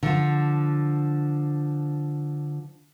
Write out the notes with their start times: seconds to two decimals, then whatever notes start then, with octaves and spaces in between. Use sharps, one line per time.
0.03 D3 F3